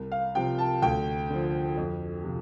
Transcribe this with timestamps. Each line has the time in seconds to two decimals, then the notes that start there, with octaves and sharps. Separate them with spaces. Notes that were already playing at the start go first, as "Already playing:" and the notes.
Already playing: C2
0.12 F5
0.35 C3 F3 G5
0.59 A5
0.82 D2 G5
1.30 D3 F3
1.77 F2
2.24 C3 F3